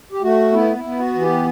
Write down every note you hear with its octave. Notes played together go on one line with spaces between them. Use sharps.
G4
A3 F#4
B3 E4
E4
B3
F#4
E3
G4